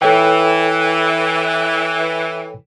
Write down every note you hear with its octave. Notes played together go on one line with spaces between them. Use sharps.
E3 A4 C#5 G5